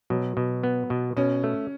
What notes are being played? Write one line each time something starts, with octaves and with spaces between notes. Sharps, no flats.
B2 F#3
B2
B3
B2
B2 C#4
A3